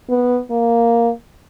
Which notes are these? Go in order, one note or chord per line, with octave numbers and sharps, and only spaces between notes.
B3
A#3